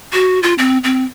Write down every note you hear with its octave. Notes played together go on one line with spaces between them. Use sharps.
F#4
F4
C4
C4